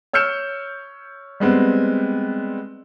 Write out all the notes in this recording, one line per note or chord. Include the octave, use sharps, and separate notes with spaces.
C#5 E6 F6 G6 C#7 E7
G3 G#3 B3 C4